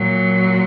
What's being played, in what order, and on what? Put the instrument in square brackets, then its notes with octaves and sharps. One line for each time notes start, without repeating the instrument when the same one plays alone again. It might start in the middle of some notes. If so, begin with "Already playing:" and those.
Already playing: [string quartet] A#2 F#3